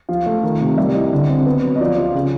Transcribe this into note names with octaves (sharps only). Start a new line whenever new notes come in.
F3 F5
A3
D#3
C3
G3 E5
E4 D#5
D3
C4
B3
F#3
D#5
F3 D5
F4
C#3